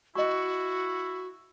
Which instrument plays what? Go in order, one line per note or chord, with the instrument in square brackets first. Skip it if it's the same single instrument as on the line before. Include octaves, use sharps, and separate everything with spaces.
[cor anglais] E4 [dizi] F#4 [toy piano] D#5 C#6